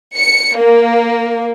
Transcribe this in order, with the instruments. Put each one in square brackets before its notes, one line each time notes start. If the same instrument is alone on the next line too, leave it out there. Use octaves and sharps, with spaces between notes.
[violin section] C#7
A#3